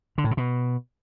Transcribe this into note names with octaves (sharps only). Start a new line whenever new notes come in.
D3
A2
C3
B2